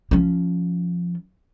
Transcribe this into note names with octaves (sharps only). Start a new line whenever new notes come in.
F3 C#4